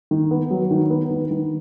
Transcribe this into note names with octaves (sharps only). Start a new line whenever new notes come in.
D#3
B3
F#3
D#3
B3
D#3
D#3